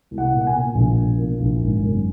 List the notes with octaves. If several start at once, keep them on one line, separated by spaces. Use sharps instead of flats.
C2
F#5
A#2
F#5
G#5
A#2
A#1
A#1
A#2
A#1
G#1
F#2